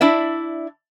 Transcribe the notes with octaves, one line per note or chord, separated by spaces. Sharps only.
D4 E4 D5 E5